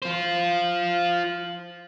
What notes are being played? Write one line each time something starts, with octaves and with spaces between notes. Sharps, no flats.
F4 C5